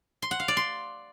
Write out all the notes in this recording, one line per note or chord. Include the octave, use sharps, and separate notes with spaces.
C6
F#5
F5
D5
C6